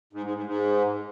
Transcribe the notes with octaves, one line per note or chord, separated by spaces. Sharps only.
G#2
G#2
G#2
G#2